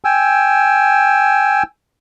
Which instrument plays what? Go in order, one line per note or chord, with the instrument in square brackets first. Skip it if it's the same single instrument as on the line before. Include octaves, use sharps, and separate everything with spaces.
[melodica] G5 G#5 E6